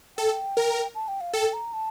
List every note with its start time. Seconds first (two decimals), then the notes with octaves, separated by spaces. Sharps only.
0.17 A4 G5
0.57 A#4
0.95 A5
1.08 G5
1.21 F5
1.33 A4 G5
1.53 A#5
1.73 A5